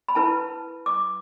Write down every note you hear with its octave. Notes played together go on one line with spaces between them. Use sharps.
B5
E4 B4 A5
D6